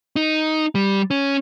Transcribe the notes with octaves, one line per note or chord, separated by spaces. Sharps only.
D#4
G3
C#4